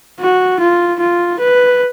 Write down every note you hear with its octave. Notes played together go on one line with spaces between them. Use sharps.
F#4
F4
F4
B4